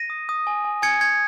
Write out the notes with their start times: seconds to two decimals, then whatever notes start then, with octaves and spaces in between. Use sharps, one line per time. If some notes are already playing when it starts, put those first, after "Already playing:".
Already playing: A#6 D#7
0.10 D#6
0.29 D#6
0.47 G#5
0.65 G#5
0.82 G#5 G#6 C#7
1.01 G#5 G#6 C#7